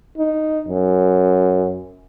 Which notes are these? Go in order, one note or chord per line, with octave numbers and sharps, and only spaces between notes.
D#4
F#2